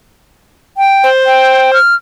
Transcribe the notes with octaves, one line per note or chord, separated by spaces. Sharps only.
G5
C5
G5
F6